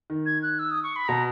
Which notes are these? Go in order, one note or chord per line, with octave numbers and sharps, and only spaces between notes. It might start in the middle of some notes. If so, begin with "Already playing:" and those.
D#3
G#6
F#6
E6
D#6
C#6
B5
B2 A#5